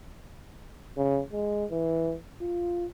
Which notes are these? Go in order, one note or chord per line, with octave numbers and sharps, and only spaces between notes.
C#3
G#3
E3
F4